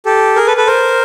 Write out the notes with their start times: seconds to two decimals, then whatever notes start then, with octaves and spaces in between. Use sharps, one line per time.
0.06 G4 A4
0.36 G#4 A#4
0.47 A4 B4
0.57 A4 B4
0.67 A#4 C5